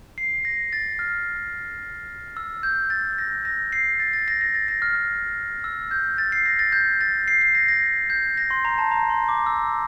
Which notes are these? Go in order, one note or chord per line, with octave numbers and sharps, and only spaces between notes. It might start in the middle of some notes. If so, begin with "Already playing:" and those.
C7
A#6
A6
F6
E6
G6
A6
A#6
A#6
C7
A6
A6
A#6
A#6
A6
A#6
F6
F6
E6
G6
A6
C7
A#6
A6
G6
A6
C7
C7
A#6
A#6
G6
A#6
C6
A#5
A5
A#5
C6
D6
E6